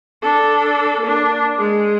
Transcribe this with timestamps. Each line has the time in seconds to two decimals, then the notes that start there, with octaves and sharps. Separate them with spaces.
0.22 D4 A4
1.01 A#3 D4
1.56 G#3 G#4